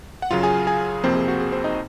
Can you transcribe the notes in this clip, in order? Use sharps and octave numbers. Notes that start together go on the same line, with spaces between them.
F#5
F#2 C#3 F#3 F4 F5
G#4 G#5
G#4 G#5
F2 C3 F3 A#3 C4 C5
G#4
F#4
G#4
C4 C5
D#4 D#5